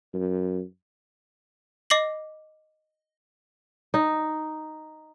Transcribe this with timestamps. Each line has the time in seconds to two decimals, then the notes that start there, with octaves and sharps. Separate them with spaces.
0.14 F#2
1.90 D#5 D6 A#6 C7 F#7
3.94 D#4